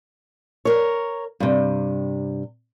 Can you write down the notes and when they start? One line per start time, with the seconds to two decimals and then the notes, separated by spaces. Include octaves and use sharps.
0.65 A#4 C#5
1.40 G2 C3